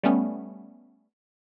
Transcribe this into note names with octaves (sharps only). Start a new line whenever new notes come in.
G3 A3 B3 C#4